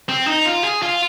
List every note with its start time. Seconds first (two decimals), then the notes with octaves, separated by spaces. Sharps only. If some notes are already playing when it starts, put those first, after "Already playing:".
0.09 C4
0.27 D#4
0.45 F4
0.64 G#4
0.83 F4